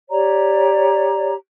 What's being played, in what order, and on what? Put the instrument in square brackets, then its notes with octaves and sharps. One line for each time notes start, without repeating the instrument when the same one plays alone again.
[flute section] G4 C#5 D5 A#5